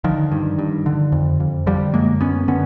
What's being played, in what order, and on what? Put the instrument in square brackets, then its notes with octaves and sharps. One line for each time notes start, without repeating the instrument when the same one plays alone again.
[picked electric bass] D3 D#3 F3
G2
G2
D3
F2
F2
D3 F3 G3
F#2 G#3 A#3
F#2 B3 C#4
D3 B3 C#4